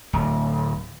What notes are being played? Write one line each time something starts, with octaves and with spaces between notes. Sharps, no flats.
D1